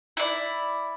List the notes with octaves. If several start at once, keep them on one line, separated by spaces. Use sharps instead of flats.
E4 D5